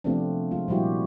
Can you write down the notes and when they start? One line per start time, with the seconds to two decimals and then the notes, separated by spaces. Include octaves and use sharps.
0.04 C3 F3 A3 B3 C4 D4
0.51 G#3 F4
0.68 A#2 F3 G3 E4 F#4 G4